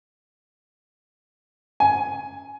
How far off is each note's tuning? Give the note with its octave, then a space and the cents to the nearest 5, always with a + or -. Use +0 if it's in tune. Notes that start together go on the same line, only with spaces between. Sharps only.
G#5 +15